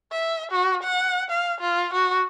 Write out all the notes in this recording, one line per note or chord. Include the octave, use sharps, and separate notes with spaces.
E5
F#4
F#5
F5
F4
F#4